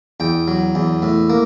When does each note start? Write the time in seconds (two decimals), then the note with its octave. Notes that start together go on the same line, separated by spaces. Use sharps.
0.20 E2 G5
0.47 F#3
0.75 E2
1.02 A2
1.30 A#3